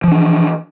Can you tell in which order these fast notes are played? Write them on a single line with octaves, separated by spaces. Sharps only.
F3 E3 D4